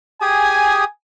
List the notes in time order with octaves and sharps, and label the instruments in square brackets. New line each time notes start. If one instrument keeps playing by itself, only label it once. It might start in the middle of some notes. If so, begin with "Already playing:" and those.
[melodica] G4 G#4 D#6 [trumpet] G#5